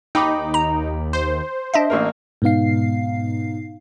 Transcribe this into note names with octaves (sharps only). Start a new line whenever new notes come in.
D#2 D#4 G5 B5 D6
A#5
C5
D4 D#5 E5
A1 A#3 A#4
G#2 B2 B3 D#4 F5 C7